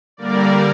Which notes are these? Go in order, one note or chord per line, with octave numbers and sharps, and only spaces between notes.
D3 G3 A#3 A#4 D5